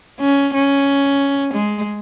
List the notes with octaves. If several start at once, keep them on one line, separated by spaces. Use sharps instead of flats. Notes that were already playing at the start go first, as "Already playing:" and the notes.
C#4
C#4
G#3